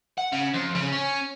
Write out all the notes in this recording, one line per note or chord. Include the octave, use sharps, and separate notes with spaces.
F#5
C#3
F2
C#3
C#4